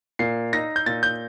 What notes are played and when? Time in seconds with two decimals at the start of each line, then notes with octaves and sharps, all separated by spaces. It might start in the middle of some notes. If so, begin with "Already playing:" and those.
0.19 A#2 C7
0.53 D#4 A#6
0.76 G6
0.86 A#2 A6
1.03 G6